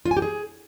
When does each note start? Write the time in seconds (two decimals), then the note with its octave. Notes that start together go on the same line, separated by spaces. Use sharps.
0.05 F4
0.11 G#5
0.17 G4
0.22 G#4